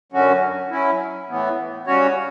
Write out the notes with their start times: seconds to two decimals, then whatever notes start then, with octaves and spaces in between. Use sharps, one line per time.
0.12 F#2 D3 F#3 C#4 F#4
0.71 F#3 C#4 E4
1.28 A2 E3 B3
1.87 C#3 G3 C#4 F#4 C#5